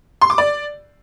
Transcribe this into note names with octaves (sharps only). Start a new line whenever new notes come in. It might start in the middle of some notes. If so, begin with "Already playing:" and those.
C6
D6
D5